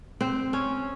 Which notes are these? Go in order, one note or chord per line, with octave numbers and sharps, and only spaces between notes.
C4
C#4